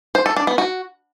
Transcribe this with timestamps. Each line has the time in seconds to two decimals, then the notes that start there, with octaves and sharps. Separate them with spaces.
0.15 C5
0.26 A4
0.36 D4
0.47 B3
0.58 F#4